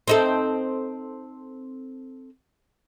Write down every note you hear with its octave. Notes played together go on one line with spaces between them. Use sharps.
C4 D#4 A4